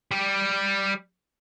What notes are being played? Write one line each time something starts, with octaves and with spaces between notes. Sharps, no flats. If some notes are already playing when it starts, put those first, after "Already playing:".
G3 G4